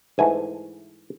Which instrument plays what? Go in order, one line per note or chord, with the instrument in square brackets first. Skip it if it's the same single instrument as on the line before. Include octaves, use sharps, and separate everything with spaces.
[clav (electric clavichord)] G#2 E3 A3 G#5